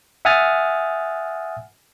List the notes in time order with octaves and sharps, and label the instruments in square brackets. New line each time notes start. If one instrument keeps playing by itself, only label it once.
[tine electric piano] E5 F#5 G#5 D#6 F6 A6